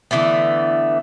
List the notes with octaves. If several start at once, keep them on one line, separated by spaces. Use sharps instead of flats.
D3 E3 A3 B3